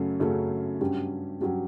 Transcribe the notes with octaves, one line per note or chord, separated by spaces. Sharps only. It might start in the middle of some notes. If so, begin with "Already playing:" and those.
Already playing: F#2 C#3 F#3 A3 C#4
F#2 C#3 F#3 A3 C#4
G2 F#3 C#4 G4
G2 F#3 C#4 G4